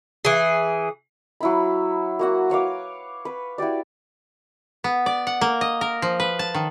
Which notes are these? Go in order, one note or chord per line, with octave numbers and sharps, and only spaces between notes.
E3 G#4
F#3 E4 B5
A#3 F#4 F#5
B4 C#5 F5 D6
B4
E4 F#4 G4 D5
B3
D5
F#5
A#3
D#5
A#4
F3
B4
A5
D#3